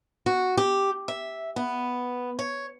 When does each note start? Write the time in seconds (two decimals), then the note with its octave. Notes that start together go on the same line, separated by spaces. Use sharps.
0.26 F#4
0.57 G4
1.08 E5
1.56 B3
2.39 C#5